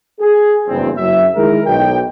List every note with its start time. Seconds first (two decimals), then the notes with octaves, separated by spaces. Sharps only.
0.21 G#4
0.68 F#1 E2 G2 C4
0.97 F#1 F#3 E5
1.36 D#3 G#3 E4 G#4 A#4
1.66 B1 G5